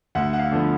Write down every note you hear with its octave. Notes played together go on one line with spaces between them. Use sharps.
D2 F#5
F#5
F5
D3 F3 B3